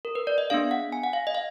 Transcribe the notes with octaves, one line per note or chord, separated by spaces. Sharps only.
A#4
B4
D5
D#5
B3 D4 G#4 F5
F#5
G#5
F#5
F5
D#5
F5